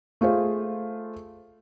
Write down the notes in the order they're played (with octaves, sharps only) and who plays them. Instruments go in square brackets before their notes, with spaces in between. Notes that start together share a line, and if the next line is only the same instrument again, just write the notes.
[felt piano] A3 F4 G#4 C5